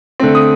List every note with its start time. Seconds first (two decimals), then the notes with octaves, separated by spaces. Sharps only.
0.20 D3 A3 C4
0.35 D#6